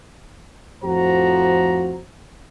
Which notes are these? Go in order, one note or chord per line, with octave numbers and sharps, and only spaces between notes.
F2 A2 F3 F#4 C5 A#5